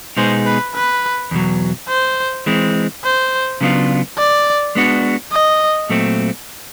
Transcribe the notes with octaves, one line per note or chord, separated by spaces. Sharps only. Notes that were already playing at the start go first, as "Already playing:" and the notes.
B2 G#3 B3 D#4 G#4 C5
B4
B4
E2 B2 F#3
C5
E3 G#3 C4
C5
C#3 F#3 B3 D4 F4
D5
G#3 B3 D4 F#4
D#5
A#2 F#3 A3 C4